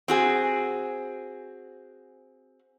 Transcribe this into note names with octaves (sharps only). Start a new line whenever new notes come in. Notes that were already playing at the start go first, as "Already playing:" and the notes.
C4 F#4 G#4